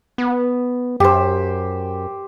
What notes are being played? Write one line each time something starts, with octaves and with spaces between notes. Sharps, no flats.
B3
F#2 G4 C5